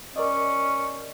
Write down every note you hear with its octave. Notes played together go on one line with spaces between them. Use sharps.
C#4 A#4 D5 D#5